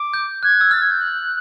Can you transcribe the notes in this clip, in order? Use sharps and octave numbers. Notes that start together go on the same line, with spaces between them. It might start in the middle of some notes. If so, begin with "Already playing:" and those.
Already playing: D6
G6
F#6 G#6
E6
F6 A6
G#6
G6
F#6